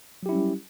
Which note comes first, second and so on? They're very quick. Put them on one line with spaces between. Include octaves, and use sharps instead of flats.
F#3 G4 E4 C#4 G3